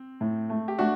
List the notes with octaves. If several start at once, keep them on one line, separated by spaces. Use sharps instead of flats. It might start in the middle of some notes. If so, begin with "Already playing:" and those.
Already playing: C4
A2
A3
G4
A3 D4 F#4